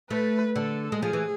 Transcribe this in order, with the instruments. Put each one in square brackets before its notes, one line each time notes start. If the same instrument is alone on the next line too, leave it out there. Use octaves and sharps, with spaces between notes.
[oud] A3 [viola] B4
[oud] D3 [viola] A4
[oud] G#3
[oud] F3 [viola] G#4
[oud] E3